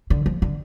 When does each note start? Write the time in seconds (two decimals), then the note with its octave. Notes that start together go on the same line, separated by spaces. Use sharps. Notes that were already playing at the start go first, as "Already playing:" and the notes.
0.10 D3
0.26 F3
0.42 D3